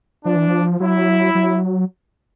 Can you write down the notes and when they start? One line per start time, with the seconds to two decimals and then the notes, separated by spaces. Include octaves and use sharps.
0.25 F3 D4
0.36 E3
0.47 F3
0.80 F#3 E4
1.35 F#3